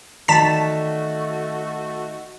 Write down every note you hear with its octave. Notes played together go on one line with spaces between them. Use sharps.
D#3 A3 F#4 D5 A5 A6 B6